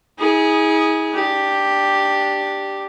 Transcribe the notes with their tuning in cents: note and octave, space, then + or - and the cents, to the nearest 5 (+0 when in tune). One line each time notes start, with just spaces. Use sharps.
E4 -45 G#4 -5
D4 +0 G4 +0